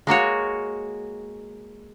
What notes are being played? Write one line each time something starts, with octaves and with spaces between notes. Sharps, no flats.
G#3 A#3 F#4 C#5